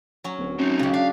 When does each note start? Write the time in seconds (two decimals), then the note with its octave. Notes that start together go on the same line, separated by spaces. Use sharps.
0.24 F#3 C#4
0.38 D1
0.58 F#2 C4 D#4
0.79 C#2 C#3 G4
0.94 D4 F5